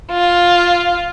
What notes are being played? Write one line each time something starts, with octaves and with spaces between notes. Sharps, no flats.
F4